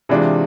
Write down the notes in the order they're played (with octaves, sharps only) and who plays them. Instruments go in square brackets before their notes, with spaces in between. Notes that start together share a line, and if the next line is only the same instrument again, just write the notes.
[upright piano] C3 E3 G#3 D4 F4